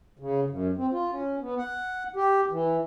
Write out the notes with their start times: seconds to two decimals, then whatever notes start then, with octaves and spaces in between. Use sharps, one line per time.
0.19 C#3
0.50 F#2
0.77 C4
0.92 F4
1.12 C#4
1.40 B3
1.58 F#5
2.16 G4
2.50 E3